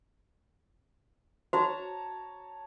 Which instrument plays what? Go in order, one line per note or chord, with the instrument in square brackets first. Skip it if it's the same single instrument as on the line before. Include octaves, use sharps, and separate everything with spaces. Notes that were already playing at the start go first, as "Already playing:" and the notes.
[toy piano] F#4 C5 [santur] C#5 A5 A#5